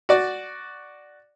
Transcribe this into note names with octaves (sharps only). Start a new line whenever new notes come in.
F#4 D5